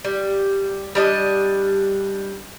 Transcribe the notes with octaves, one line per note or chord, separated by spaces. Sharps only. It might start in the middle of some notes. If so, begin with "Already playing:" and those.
G3
G3 D4 D#5